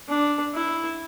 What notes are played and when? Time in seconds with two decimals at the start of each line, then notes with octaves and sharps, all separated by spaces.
0.08 D4
0.54 E4